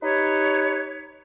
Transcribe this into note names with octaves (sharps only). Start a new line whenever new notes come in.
D#4 G4 B4 C#5